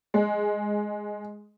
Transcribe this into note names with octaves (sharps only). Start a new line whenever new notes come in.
G#3